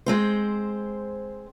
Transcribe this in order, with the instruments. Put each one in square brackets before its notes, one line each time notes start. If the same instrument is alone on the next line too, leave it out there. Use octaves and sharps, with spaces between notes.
[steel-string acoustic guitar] G#3 C4 C5